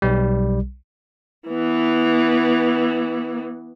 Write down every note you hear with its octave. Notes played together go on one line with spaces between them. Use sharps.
B1 G3
E3 B3